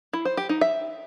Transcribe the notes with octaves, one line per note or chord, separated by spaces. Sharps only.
E4
C5
G4
D#4
E5